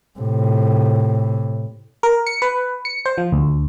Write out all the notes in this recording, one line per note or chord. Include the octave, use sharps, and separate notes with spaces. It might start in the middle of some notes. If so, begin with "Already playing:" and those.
A2 C3
A#4
C#7
B4
C#7
C5
F3
D2